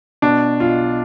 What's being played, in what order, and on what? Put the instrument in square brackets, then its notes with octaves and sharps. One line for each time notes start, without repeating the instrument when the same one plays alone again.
[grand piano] B2 D4
B1 F4